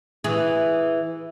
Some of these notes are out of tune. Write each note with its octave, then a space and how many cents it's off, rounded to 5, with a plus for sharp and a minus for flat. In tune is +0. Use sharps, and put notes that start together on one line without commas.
E3 +0 G#4 +0